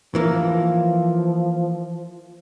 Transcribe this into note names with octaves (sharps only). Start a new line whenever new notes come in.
E3 F3 A#3